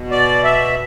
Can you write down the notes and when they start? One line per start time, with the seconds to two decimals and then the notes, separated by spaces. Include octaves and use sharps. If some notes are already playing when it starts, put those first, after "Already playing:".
Already playing: B2
0.11 D5
0.44 E5